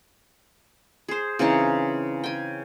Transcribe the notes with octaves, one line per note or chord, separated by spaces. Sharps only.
G#4 C5
C#3 E3 C4 D#4
G5 G#5